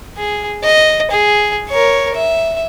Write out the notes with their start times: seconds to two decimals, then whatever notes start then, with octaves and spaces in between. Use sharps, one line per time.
0.18 G#4
0.63 D#5
1.11 G#4
1.69 A#4 C#5
2.15 E5